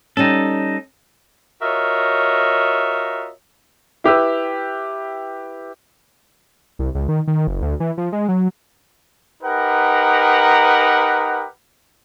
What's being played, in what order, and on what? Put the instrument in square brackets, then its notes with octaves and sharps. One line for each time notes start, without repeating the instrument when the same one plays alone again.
[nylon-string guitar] G3 C#4 [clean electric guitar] D#4 A4
[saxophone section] F4 F#4 A#4 C#5 D#5 E5
[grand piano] E4 G4 B4 E6
[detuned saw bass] C2
C#2
D#3
D#3
F#1
D2
E3
F3
G#3
F#3
[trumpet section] D#4 G4 A#4 B4 F#5